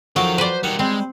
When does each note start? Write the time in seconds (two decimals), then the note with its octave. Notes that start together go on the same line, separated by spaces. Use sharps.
0.16 F2 F#3 D#4 A#4 F5 D6
0.38 B4 C5 D5
0.63 D#3 G3 A#4 F#5
0.79 G3 G#3 C4